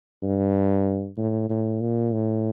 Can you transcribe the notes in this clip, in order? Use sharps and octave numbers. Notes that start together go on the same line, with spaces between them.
G2
A2
A2
A#2
A2